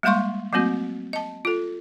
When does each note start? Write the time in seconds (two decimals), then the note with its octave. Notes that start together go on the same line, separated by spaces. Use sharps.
0.03 G3 G#3 A#3 F5 C6 C#6
0.53 F#3 A3 A#3 C4 F#4
1.13 D#5 A5
1.45 F4 A4